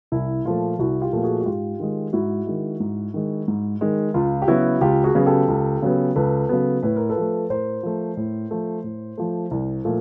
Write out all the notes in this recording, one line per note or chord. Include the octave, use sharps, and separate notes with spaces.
C2 E4
A#2 F3 A3 F4
C2 E4 F#4
F4 G4
A#2 F3 A3
F#4 G#4
F#4
G#2 F4 G4
D#3 G#3
G#2 E4 F#4
D#3 G#3
G#2
D#3 G#3
G#2
D#3 G#3
C#2 F4
G4
C#3 F#3 B3 E4 F#4
C#2 F4 G4
F#4 G#4
C#3 F#3 B3
G4 A4
C#2
C#3 F#3 B3
C#2 A4 B4
C#3 F#3 B3
A2 B4
A#4
A4 B4
F3 A3
A2 A#4 C5
F3 A3
A2
F3 A3
A2
F3 A3
C2
A#2 F3 A3